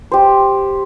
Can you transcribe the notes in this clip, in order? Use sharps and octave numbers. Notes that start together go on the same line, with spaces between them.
G4 C5